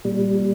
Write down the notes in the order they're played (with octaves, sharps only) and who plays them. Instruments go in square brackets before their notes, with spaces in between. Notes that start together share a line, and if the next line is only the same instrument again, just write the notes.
[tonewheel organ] A#2 G3